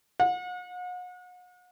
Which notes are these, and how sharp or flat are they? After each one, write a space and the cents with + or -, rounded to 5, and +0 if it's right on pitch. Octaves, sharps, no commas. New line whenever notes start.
F#5 -40